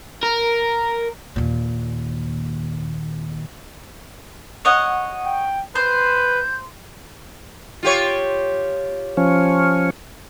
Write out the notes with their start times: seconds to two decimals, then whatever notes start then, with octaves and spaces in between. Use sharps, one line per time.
0.23 A#4
1.36 D#2 A#2
4.65 C#5 D#5 F#5
5.26 G5
5.75 B4 C5 G6
7.83 F4 G4 C#5
9.17 F3 C#4